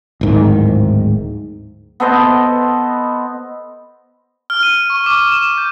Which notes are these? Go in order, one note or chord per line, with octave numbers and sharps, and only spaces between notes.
D1 G#2 D#3
B3 A4 C5 D#5
F6
D#7
C#6
D6
E7
G6